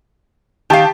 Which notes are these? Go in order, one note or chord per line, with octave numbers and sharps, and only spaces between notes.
D#3 G4 F5 A5